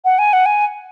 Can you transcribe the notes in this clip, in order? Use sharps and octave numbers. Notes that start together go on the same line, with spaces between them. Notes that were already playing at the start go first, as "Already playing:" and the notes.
F#5
G#5
F#5
G#5